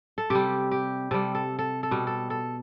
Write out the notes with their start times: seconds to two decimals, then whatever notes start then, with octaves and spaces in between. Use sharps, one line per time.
0.18 A4
0.30 C3 G3 G4
0.71 G4
1.11 C3 G3 A4
1.35 A4
1.59 A4
1.83 A4
1.91 B2 G3
2.07 A4
2.30 A4